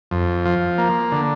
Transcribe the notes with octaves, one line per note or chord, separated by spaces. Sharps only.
F2
F3
A#3
D3